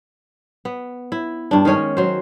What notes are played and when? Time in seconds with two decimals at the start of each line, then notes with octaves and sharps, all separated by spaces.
0.65 B3
1.12 E4
1.51 G2 D4
1.65 D#3 G#3 C#4 C#5
1.97 F#3 C5